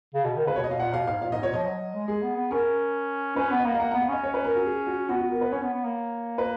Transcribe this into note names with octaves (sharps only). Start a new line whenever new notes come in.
C#3
B2
D#3
C#3 B4
B2 C#5
D#5
B2 F5
A#2 F#5
B2 F5
G#2 F5
A#2 F5
G#2 D#5
A#2 C#5
F3 D#5
F#3
F#3
G#3
G#3 G#4
B3
B3
C#4 A#4
C#4 B4
B3
D#5
A#3
F5
A#3 F#5
B3 F#5
F5
C#4 D#5
C#5
B4
A#4
F#4
G#4
F#4
B3 F#4
F#4
A#4
B4
C#4 C#5
B3
B3
A#3
B4